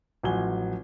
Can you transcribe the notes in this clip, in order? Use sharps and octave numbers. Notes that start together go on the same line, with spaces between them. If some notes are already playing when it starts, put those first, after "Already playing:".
A1 F3 F#3 F#5 G#5 G7